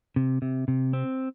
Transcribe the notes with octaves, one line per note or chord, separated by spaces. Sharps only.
C3
C3
C3
C4